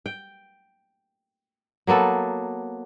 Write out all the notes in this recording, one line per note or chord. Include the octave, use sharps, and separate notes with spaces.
G5
F#3 A#3 B3 A4